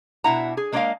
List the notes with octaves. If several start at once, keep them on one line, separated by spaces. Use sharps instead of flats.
B2 D4 E4 F#5 A#5
G#4
G#3 A#3 D4 D5 D#5 F5